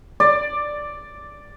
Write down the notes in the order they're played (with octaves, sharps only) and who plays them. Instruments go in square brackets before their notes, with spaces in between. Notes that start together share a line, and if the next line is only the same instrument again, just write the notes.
[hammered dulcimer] D5